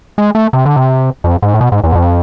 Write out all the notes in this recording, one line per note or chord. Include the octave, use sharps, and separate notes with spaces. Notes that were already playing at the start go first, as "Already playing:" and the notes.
G#3
A3
C3
D3
C3
F2
G#2
A2
B2
G#2
E2
G#2
F2